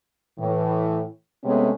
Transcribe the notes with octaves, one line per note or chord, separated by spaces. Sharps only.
A2 E3
C3 G#3 A3 B3 C#4